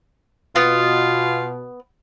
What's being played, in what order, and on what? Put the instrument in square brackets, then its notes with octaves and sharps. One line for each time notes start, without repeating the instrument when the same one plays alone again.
[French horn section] B2 [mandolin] B3 [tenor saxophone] F4